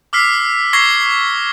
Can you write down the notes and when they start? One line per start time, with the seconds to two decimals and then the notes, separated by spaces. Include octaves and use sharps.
0.13 D6 E6 F6 B6 C7
0.73 C#6 E6 G#6 A#6 C7 G7